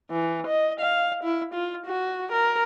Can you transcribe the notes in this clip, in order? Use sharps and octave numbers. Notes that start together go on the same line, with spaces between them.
E3
D#5
F5
E4
F4
F#4
A#4